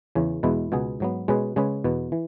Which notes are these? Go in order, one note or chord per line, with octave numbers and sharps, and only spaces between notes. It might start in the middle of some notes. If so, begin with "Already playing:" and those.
E2 C#3 E3 C#4
E2 B2 G#3 E4 B4
C#2 B2 B3 G#4
G#2 F#3 B3
B2 G#3 C#4 G#4 B4
C#3 G#3 C#4 G#4 B4
E2 B2 B3
E3